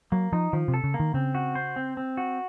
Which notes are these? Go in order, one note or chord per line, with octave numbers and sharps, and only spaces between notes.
F#3 A#3
F3 D#4
D#3 F3
C3
A4
C#3
A#3
D#3
C#3 C4
F#4
C5
C4
C4
F#4